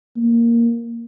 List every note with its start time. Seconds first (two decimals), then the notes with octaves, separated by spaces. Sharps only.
0.16 A#3